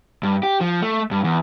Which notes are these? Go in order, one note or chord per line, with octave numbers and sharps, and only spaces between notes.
G2
G4
F3
A3
G2
E2